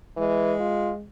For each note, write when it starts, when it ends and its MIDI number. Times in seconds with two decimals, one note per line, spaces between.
0.17 0.55 52
0.17 1.07 56
0.60 0.91 65